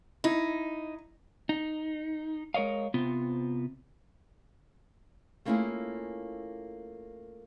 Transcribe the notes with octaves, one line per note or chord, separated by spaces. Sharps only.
D#4 E4
D#4
G#3 A#4 C#5 D#5 F5
C3 B3 C4 F4
A3 A#3 C#4 E4 F4 G#4